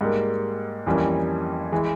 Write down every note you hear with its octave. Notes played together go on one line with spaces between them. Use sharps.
G#2 G3 A#3
F2 E3 G3 A#3 C#4
E3 G#3